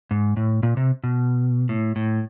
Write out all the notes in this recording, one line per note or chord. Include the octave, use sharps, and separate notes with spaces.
G#2
A2
A#2
C3
B2
A2
A2